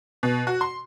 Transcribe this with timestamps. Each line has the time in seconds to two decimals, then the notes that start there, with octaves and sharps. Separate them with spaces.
0.23 B2
0.47 F#4
0.61 C6